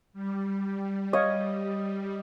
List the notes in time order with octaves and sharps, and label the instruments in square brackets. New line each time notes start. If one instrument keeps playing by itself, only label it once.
[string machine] G3
[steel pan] C#5 F5 [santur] D#5